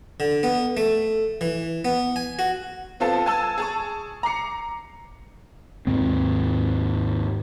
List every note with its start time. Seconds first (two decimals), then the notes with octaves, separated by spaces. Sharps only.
0.20 D3
0.43 B3
0.77 A3
1.41 E3
1.85 B3
2.16 G#5
2.39 F#4
3.00 B3 C4 F4 A4 A5
3.26 G#5 A5 E6
3.58 G#4 A5 C#6
4.23 A#5 D6 C7 C#7
5.87 D#2 G#2 A#3 C4